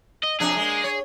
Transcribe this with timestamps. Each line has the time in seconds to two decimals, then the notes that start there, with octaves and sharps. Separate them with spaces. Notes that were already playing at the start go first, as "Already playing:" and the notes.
0.23 D#5
0.40 F2 C3 D4 G#4
0.57 G#3 A#3
0.84 C#5